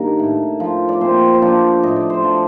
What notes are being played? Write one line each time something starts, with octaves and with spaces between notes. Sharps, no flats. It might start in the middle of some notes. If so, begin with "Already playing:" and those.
Already playing: G2 D#3 A#3 A#4
A2
F3
D5
A#2 C4 C5
C5
F3 D4 D5
A2 D#5
D5
C5
F3 D4 D5